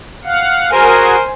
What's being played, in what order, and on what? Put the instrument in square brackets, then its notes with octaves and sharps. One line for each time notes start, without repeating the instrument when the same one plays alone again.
[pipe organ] F5 F#5
[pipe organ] F#4 G#4 [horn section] A#4 [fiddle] C5 [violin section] G#5